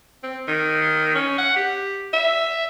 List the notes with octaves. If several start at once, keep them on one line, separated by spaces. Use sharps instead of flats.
C4
D#3
C#4
F#5
G4
E5